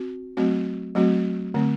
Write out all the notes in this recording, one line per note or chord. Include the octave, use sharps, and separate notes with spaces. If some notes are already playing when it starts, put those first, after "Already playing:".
Already playing: C4 F#4
F#3 A3 C4 F#4
F#3 A3 C4 F#4
D3 A3 C4